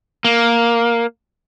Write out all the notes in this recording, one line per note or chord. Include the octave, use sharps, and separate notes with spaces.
A#3